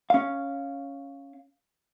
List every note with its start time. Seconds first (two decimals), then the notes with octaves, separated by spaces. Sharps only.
0.10 C#4 F5